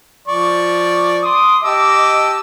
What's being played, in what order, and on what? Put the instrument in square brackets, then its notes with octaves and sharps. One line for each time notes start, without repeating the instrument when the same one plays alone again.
[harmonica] F3 D5 C#6
[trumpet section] C6 D6 D#6
[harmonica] G4 A5 E6 [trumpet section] D#5 D6